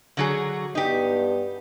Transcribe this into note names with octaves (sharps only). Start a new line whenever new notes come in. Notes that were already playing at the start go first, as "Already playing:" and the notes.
D3 F#3 G#4
G2 B3 D#4 G4